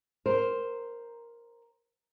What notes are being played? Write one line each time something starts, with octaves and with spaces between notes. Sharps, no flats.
A#4 C5